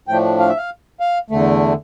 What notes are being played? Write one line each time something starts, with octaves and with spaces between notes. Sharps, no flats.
A2 F3 A3 D4 G5
F5
E5
F5
F5
E2 D3 A3